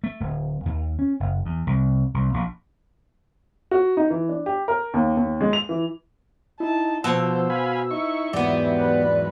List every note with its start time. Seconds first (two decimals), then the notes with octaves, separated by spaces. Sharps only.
0.04 A3
0.20 D1
0.66 D#2
0.99 C#4
1.20 F#1
1.46 E2
1.67 C2
2.14 C2
2.34 A#1
3.71 F#4
3.97 D#4
4.10 E3
4.29 D4
4.46 G4
4.68 A#4
4.94 D#2
5.17 D#2
5.41 G#3
5.53 F7
5.69 E3
6.60 D#4 E4 A5
7.04 B2 F3 C5 A5 E6
7.50 F5 G#5 B5
7.91 D#4 E4 C#6
8.33 E2 G#2 F#3 B3 G4 D5
8.78 B4